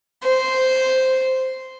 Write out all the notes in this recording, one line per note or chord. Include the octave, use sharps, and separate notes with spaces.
C5